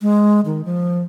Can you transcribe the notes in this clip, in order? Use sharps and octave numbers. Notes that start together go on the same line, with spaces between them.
G#3
D#3
F3